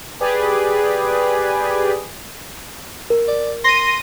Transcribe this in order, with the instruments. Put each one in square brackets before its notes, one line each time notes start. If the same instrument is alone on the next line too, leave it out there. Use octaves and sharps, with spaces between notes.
[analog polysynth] G4 G#4 B4 D5
[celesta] A#4
[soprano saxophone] D5
[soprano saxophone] C6 [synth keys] A#6 D#7